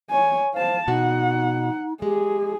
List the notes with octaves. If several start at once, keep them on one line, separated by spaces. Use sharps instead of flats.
C#5 G#5
C5 F5 A5
B2 D#4 F#4 F#5
G#3 G4 G#4